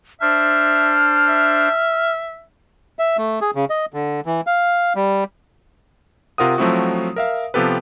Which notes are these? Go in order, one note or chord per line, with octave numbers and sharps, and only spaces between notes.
D4 C5 E5 F6
E5
E5
A3
G#4
C#3
D#5
D3
E3
F5
G3
C3 F4 A#4 F#5 D#6
F3 F#3 A3 C4 E4 F#4
A#4 E5 F5
C3 F3 B3 G4 A4 B4